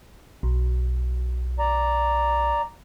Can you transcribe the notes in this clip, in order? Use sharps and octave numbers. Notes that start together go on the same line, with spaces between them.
B1
D5 A#5